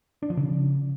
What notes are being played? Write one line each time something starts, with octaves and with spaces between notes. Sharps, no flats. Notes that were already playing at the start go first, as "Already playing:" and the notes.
D4
F3
C#3